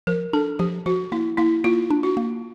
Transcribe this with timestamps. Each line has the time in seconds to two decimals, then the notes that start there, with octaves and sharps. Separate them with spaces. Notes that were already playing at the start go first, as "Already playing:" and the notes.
0.07 F3 A#4
0.33 D4 A4
0.59 F3 G4
0.86 F3 F#4
1.12 A#3 E4
1.38 A#3 E4
1.64 A#3 F4
1.90 D4
2.03 F#4
2.17 A#3